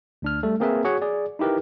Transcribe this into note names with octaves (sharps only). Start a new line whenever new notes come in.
D2 D4 F6
G3 A3 A4
A#3 C4 G#4 A#4 B4 E5
F#4 G#4 C#5 F#5
G#4 D5
D#4 E4 G4 A#4 B4